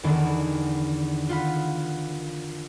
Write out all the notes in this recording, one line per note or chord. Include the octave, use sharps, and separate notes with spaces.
E2 D3 D#3 B3 D4
F4 F#5 B5